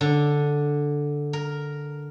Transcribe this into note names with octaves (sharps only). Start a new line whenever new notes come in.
D3
A#4